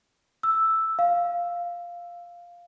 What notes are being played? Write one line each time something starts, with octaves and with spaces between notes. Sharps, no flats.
E6
F5